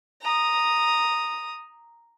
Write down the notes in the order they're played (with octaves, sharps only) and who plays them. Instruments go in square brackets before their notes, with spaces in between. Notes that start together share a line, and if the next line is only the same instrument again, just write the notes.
[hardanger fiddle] A#5 D#6